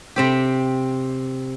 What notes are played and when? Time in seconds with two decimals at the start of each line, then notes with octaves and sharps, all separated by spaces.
0.16 C3 C4 G4